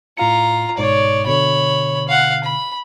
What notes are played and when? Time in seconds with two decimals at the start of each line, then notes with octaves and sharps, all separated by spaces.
0.17 A2 F4 F5 A#5 C#7
0.78 G1 G#2 B2 C#5 D5
1.27 B2 D3 C#5 B5
2.08 F5 F#5
2.44 B5